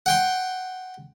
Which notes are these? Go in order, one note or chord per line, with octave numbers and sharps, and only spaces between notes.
F#5 G5 C6